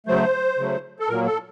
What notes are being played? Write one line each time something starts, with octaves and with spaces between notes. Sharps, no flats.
C#3 F#3 A3 C5
C#3 F#3 A3
A4
A#2 F#3 A#3 A#4
A4